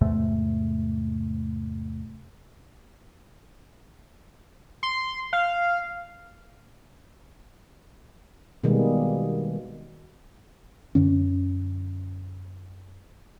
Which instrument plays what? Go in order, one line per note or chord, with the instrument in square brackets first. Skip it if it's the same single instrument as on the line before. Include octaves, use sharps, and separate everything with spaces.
[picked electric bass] E2 G#2 C3 A3
[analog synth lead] C6
F5
[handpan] B2 D#3 G3 G#3 A#3 B3
[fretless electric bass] F#2 D3 C#4